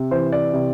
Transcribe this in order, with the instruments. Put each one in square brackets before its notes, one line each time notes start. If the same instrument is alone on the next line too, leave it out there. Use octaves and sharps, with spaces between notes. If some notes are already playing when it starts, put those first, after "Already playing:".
Already playing: [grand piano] C3
E3 C5
D5
C3